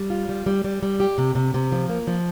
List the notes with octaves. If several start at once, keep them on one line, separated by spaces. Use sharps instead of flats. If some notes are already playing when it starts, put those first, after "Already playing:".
Already playing: G3
F4
G3
G3
G3
G3
G4
C3
C3
C3
F3
A#3
F3